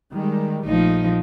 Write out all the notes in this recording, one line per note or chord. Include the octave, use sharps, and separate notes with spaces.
D#3 G3 G#3
A#1 F3 A3 D#4